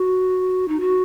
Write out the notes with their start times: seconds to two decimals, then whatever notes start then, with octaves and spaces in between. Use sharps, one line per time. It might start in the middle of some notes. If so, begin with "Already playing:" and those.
Already playing: F#4
0.68 D#4
0.80 F#4